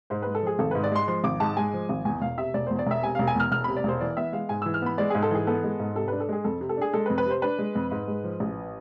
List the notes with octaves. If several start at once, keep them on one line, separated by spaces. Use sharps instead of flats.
G#2 C5
G#3 B4
A4
F3 G#4
G#1 A4
G#2 B4
D5
G#3 C6
F3 C6
G#1 D6
G#2 A5
G#3 G#5
F3
G#1
E2 G#5
E1 F5
C3 E5
E1 D5
E2 C5
D5
E1 E5
C3 G#5
E1 F5
G#5
E2 F6
E1 F6
C3 B5
D5
E1 C5
E3 D5
B3 E5
G#3 F5
G#2 G#5
E3 E6
F6
B3 B5
G#3 D5
G#2 G#4
A4
E3 G#4
B3 A4
G#3
G#2
C3 A4
D4 B4
A4
G#3 G#4
F2 A4
C3
A4
D4 G#4
G#3 A4
B4
F2
B4
C3 C5
D4 B4
G#3
F2
G#2
G#3
F3
A1